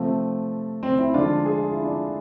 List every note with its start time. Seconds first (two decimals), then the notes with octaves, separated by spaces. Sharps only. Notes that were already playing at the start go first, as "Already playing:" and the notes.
Already playing: C3 F3 A3 C4
0.83 C4
0.98 C4 E4
1.14 D3 F3 G#3 D4 F4
1.45 G#4
1.59 F4
1.71 E4
1.84 D4 F4